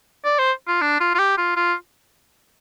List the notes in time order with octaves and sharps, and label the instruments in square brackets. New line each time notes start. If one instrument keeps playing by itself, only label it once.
[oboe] D5
C5
F4
D4
F4
F4
G4
F4
F4